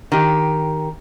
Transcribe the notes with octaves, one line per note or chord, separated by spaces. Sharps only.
D#3 G4